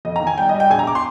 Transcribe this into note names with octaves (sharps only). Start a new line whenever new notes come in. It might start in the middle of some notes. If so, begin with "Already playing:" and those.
F2 D#5
A#5
D#3
G#5
G3 G5
D#5
G3
G5
A#1 G#5
A#5
D6
C6